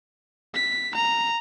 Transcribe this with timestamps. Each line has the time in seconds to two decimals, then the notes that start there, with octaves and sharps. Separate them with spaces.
0.55 B6
0.95 A#5